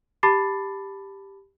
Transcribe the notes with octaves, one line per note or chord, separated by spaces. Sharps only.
G4 A5 B5 D6 A6 C7